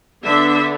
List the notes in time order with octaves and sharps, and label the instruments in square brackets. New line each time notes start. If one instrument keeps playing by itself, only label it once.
[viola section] D3 B3 D4 E5